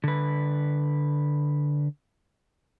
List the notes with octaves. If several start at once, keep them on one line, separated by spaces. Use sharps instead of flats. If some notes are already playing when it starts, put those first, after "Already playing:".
D3 B4